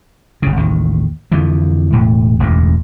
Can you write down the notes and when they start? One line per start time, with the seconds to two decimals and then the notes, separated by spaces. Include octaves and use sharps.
0.42 F#1 C#3
0.56 A1 D#2 D#3
1.32 F2 D3 E3 F3
1.93 E1 A2
2.40 E1 A1 D2 G#2